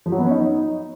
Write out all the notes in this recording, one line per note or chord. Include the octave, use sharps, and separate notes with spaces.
F3
F#3
B3
C#4
D#4